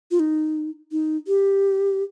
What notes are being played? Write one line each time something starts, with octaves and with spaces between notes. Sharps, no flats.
F4
D#4
D#4
G4